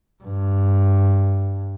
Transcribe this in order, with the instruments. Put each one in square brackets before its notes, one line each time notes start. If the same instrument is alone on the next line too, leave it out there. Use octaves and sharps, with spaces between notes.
[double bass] G2